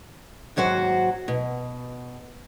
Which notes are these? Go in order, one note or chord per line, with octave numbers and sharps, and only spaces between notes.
D#2 G#2 F#3 F#4 C5
B2